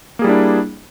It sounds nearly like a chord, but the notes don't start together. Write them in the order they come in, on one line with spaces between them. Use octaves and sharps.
A#3 G#4 G3 E4 D4